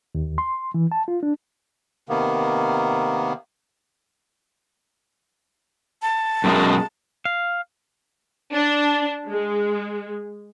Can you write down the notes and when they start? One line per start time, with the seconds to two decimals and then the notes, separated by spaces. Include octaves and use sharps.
0.15 D#2
0.38 C6
0.74 E3
0.92 A5
1.08 F4
1.23 D4
2.09 C3 D#3 A#3 B3
6.02 A5
6.44 F#2 B2 G#3
7.25 F5
8.53 D4
9.29 G#3